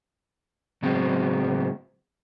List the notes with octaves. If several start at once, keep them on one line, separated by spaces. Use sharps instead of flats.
A2 C#3 F#3 G#3 B3 C4